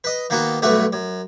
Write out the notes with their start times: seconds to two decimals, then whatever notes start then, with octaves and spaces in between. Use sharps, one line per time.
0.04 B4 D#5
0.30 D#3 A#3 B3 F#4
0.62 B1 G2 A3 F#4 B4
0.93 F#2